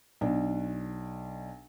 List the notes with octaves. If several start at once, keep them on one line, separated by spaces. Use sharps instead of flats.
B1 D4